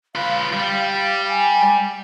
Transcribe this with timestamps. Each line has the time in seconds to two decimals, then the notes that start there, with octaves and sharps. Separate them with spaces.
0.15 F4 B4 F5
0.53 G3
1.29 G#5